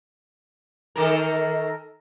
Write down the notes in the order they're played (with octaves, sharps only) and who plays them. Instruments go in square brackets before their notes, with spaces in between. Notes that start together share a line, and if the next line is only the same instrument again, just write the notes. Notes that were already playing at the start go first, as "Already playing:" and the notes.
[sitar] D#3 A4 A#4